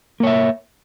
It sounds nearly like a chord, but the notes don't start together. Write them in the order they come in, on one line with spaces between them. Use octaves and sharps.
A#3 C#5 E5